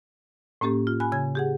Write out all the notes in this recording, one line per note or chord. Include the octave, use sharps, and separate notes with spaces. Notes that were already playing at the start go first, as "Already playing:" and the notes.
A2 A#3 C#4 G4 A4
F4
G#5 B5 F#6
C#3 G#5 G#6
G4 G#4 F#5